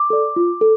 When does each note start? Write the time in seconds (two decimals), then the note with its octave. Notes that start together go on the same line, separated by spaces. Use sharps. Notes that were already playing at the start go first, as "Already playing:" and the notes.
Already playing: D6
0.10 A4 D5
0.36 F4
0.61 A4